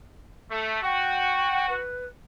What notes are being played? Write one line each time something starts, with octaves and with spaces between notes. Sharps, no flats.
A3
F#4 G5
B4